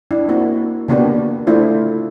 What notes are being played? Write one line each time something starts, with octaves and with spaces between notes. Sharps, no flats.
D4 E4
A#3 C4 E4 F#4
C#3 A#3 B3 D4 F#4 G4
A3 D4 E4 F4 C5